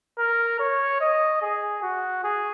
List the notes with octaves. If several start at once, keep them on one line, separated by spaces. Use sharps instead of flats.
A#4
C#5
D#5
G#4
F#4
G#4